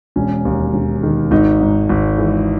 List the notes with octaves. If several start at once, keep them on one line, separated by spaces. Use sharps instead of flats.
E1 C#4
D#2
E1
D#3
G#1 D#4
G#2
G#1
E3